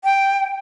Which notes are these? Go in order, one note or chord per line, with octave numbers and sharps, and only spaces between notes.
G5